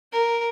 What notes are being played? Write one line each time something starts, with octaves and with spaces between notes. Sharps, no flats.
A#4